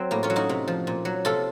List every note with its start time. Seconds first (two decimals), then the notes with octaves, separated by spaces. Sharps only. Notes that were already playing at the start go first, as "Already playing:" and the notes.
Already playing: F#3 C4
0.11 A2 A#3
0.23 C#4 F4
0.30 F#3
0.36 D#4 F#4
0.49 C3
0.68 F3
0.87 A#2
1.05 F#3
1.25 C3 F4 A4